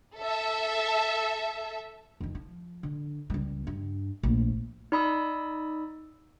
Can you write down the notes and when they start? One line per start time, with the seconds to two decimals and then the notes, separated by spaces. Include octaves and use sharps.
0.17 A4 E5
2.20 F2 D#3
2.35 F3
2.83 D3
3.30 C#2 G3
3.67 G2
4.23 A#1 A2
4.92 D#4 D5 B5 D#6 E6